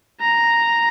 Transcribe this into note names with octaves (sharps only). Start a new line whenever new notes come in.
A#5